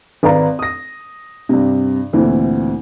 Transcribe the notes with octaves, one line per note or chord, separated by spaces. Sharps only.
G#1 B4 D5 F5 A#5
D#6 A#6
G2 C3
D2 A#2 E3 C4